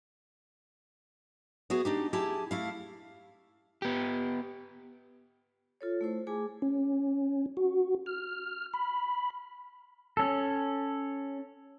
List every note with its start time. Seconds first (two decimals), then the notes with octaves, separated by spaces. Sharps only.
1.70 B3 E4 F#4 G#4
1.85 D4 D#4 G4
2.13 E4 G4 G#4 A5
2.51 A3 E4 F5
3.82 B3 G4
5.81 F4 A4 C#5
6.01 A3 E4 C5
6.27 A3 G#4 G#5 D6
6.62 C#4
7.57 F#4
8.06 F6
8.74 B5
10.17 C#4 A4